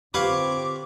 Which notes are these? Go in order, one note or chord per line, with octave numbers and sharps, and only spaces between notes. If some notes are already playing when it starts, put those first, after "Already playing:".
D3 C4 F4 G4 B4 C#5 F5 D6